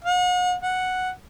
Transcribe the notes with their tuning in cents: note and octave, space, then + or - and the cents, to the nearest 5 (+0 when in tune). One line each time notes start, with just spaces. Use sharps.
F#5 -40
F#5 +0